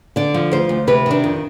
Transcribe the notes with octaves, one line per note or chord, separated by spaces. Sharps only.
D3 D5
F3
D2 C5
D2
C3 B4
D#3 D4
F2